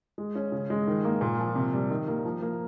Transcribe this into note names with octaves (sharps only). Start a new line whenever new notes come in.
G#3
C#4
C#3
G#3
D#3
A#3
A#2
F3
C3
G3
D#3
A#3
F3
A#3